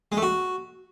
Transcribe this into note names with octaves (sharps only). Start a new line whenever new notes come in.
G#3
A3
F#4